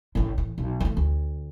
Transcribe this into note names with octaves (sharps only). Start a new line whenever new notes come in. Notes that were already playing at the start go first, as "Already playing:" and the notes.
A1 A2
A2 E3
B1
E3 A3
D2